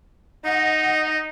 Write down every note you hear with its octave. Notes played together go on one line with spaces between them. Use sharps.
D#4 D#5 F#5